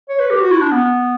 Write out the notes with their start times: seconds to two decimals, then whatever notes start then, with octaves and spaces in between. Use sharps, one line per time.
0.09 C#5
0.19 B4
0.30 G4
0.41 F#4
0.51 E4
0.61 D4
0.71 B3